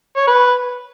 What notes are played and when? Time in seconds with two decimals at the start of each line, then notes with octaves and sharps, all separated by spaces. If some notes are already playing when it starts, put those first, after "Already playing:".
0.17 C#5
0.27 B4